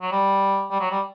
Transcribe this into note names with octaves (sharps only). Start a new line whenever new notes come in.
F#3
G3
G3
F#3
G3